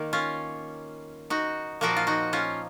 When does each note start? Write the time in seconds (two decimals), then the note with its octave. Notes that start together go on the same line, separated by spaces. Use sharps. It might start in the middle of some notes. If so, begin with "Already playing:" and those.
Already playing: D#3 A#3
0.13 C#4 F4
1.30 D#4 F#4
1.81 A#2 F3 A#3 F#4 A#4
1.96 F4
2.07 D#4 F#4
2.33 C#4 F4